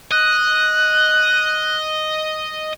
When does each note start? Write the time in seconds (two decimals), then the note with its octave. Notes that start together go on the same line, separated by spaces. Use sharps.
0.12 D#5 F#6